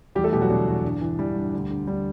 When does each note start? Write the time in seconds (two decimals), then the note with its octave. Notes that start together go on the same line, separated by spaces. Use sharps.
0.15 E2 G3 G4
0.24 A3 A4
0.32 B2 G3 G4
0.41 F#3 F#4
0.50 B2 D3 D4
0.67 E2
0.85 G2
1.02 E3
1.19 E3 G3
1.36 G2
1.54 D2
1.71 D3
1.87 D3 G3